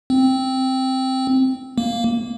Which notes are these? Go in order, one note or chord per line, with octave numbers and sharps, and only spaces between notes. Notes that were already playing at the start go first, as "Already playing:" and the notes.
C4
A#3